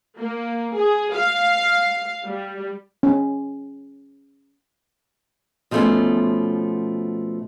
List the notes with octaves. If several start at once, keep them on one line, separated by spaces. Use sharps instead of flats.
A#3
G#4
F5
G3
C#4
B2 F3 G3 A3 B3 C#4